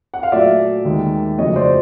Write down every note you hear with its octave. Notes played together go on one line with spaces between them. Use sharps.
F#5
F5
A#2 F#3 A3 D5 E5
D#2 D#3 G#3
F2 C#3 F#3 A3 C#5 D#5
C5 D5